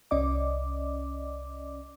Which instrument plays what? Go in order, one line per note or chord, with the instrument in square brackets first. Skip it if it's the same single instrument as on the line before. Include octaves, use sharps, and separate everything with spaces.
[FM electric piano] C2 C#4 D5 D#5 D6